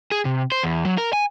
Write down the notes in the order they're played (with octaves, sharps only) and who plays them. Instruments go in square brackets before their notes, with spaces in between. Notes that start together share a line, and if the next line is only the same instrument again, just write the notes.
[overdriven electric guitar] G#4
C3
C5
E2
F#3
A#4
G#5